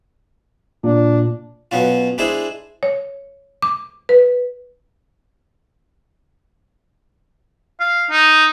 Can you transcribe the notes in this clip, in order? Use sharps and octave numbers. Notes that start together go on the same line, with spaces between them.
A#2 D4
B2 F#3 B3 C#4 F4
G#3 D4 E4 G#4 C5
C#5
D6
B4
F5
D#4